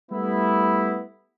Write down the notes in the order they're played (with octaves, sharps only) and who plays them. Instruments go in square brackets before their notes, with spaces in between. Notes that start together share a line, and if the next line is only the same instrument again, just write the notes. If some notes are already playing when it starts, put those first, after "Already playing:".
[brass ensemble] G3 A3 B3 E4